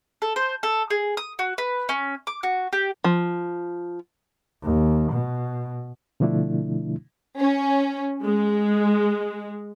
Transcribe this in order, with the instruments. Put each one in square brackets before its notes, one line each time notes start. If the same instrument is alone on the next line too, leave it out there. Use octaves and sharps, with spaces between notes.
[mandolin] A4
C5
A4
G#4
D#6
F#4
B4
C#4
D6
F#4
G4
[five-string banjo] F3
[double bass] D#2
B2
[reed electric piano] B2 D3 F3 A3 D4 E4
[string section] C#4
G#3